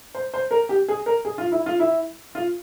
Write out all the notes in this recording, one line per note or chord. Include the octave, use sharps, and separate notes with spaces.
C5
C5
A#4
G4
G#4
A#4
G#4
F4
E4
F4
E4
F4